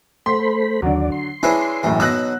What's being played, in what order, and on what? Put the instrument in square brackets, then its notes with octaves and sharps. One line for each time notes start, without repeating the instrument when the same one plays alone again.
[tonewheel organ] A3 C5 B5 [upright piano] C6
[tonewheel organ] D#2 D5 [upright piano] D3 F#3
[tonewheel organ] C6
[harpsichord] G#3 C#4 D4 [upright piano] E4 B4
[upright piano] E1 F#2 A2 [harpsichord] E3
[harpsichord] B2 F#3 D#4 [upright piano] E6 F#6 A#6